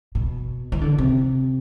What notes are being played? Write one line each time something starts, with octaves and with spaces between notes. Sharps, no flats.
B2
E3
D3
C3